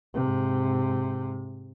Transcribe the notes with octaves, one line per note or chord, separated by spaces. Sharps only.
G#2 C3